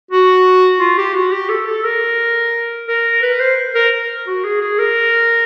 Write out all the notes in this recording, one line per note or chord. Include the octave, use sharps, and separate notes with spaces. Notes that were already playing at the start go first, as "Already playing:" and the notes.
F#4
F4
G4
F#4
G4
A4
A4
A#4
A#4
B4
C5
A#4
F#4
G#4
G#4
A#4